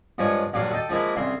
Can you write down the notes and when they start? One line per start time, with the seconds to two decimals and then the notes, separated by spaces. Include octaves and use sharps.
0.18 G2 F3 G#3 C#5
0.53 A#1 G2 F#3 D4 F5
0.71 A4 D#5 G5 A5
0.90 F3 G#3 A#3 E4
1.16 C2 C#3 E5 C6